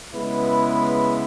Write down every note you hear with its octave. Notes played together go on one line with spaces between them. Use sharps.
C#3 G#3 B3 E4 B4